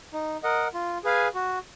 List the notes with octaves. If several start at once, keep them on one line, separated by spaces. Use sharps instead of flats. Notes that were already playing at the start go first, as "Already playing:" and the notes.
D#4
A#4 D#5 F#5
F4
G#4 B4 F5 G#5
F#4